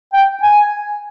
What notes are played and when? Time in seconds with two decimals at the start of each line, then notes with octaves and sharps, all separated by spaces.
0.13 G5
0.43 G#5